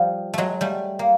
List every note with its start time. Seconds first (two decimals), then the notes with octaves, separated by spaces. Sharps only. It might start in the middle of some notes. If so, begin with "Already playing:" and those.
Already playing: F3 G3
0.34 F#3 G#3 A3
0.61 G3 A3
0.99 A#3